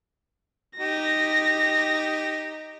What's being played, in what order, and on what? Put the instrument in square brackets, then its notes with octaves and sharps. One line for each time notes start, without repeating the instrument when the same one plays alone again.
[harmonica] D#4 G4 [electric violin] A#6